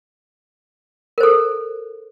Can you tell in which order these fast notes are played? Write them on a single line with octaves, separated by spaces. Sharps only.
A#4 C5 A4